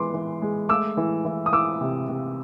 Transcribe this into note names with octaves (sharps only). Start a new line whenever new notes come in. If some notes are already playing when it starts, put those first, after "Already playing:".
Already playing: E3 G#3 B3 C6 D6
E3
G#3
A3 D6 E6
E3
E3
D#6
E3 D6 E6
C3
C3